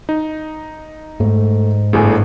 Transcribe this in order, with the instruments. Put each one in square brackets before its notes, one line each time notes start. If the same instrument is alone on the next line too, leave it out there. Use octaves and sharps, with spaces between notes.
[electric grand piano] D#4
[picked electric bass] G#2 [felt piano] A3
[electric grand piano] G1 A2 [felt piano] G#4 A4 G#5